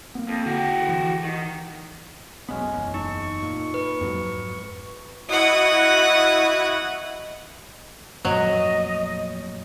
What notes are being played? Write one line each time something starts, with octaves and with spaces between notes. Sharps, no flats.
A#3 B3
F2
D3 F#4 G4
E3
D#3
F1 B1 G#3 B3 C#4
F#1 E2
D#4 C#6
A#2
B4
F2 G#2 F#3
E4 F#4 D#5 F#5 C#6 D#6
F2 A#2 F#3 A3 D#5